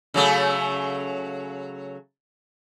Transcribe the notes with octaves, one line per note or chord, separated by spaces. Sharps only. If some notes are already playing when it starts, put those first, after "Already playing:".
C#3 F#3 A3